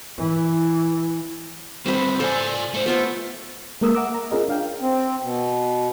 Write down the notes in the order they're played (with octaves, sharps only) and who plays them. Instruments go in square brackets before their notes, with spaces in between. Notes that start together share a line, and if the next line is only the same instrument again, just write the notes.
[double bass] E3
[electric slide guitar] G3 C4 A4 [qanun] B4 C5
[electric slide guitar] F4 D5 G#5 [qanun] A4 C5
[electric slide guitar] A3 C5
[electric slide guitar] A3 [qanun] B3 F4 C5
[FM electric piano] G#3 A#3 A#4 D#6 E6
E5 F#5 A#5 D6 E6
A#5
C#4 F4 G#4 A#4 D#5
D4 F5 G5
[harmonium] C4
B2